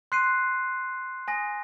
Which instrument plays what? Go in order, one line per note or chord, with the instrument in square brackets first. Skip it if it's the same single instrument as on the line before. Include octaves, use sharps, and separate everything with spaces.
[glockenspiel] C6 F#6 C7 D#7
G#5 D#6 A#6